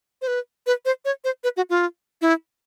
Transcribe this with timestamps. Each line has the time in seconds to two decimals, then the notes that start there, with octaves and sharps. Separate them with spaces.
0.22 C5
0.27 B4
0.67 B4
0.85 C5
1.05 C#5
1.24 C5
1.44 B4
1.57 F#4
1.70 F4
2.22 E4